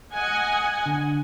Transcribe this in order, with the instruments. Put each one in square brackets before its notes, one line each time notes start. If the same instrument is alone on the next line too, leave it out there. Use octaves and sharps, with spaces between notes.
[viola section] D#5 F#5 G#5
[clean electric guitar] D3